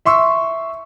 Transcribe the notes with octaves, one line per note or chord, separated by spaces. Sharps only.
E5 C6 C#6 E6